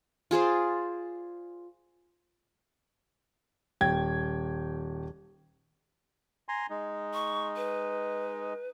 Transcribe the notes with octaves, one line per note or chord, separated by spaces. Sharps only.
F4 G#4 C5 D5
D#1 G5 G#6
G#5 A#5 C6
G#3 D#4
C#6
B4